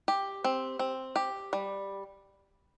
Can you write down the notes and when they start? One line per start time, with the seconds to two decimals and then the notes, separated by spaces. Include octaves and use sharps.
0.08 G4
0.44 C4
0.79 C4
1.16 G4
1.53 G3